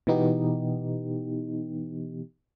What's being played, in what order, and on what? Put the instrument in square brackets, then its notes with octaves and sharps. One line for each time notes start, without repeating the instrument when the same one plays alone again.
[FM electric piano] B2 E3 B3 D#4 G4